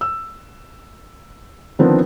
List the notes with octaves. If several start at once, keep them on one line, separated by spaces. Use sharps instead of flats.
E6
D3 D#3 F3 B3 C4 D4